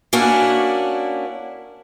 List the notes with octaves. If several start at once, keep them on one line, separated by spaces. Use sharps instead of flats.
A#3 C#4 D4 E4 F#4